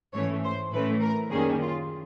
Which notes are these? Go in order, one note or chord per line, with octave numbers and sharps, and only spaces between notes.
G#2 E3 A3 C#4 C#5
C5
A2 E3 A3 C#4 B4
A#4
F#2 D#3 G3 A#3 C#4 G#4
F4